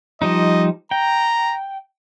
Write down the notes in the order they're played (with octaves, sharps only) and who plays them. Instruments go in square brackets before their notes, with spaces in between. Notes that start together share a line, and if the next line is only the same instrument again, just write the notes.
[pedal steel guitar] F3 G3 D#4 [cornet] D#5
[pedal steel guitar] G5 [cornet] A#5